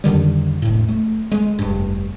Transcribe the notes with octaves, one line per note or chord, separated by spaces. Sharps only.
F2 D3 D#3 G3
E1 A2
A3
G#3
F1 G2